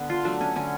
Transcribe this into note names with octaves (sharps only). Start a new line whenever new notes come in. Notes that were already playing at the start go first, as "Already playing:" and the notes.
Already playing: D3 B3
F4
F#3 A3 D4
C#4
D3 C#4